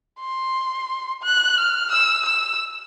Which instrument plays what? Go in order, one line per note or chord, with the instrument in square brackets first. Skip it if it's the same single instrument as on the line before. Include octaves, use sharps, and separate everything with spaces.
[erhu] C6
F#6
F6
E6
E6